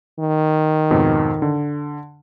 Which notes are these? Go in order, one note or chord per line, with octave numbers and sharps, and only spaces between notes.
D#3
F2 G#2 B2
D3